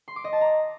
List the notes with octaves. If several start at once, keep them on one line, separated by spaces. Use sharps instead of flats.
C6
D6
D#5
A5
A#5